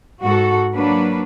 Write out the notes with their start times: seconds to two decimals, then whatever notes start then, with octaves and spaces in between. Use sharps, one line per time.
0.22 G#2 F#4 A4
0.74 F#3 A#3 D4 B4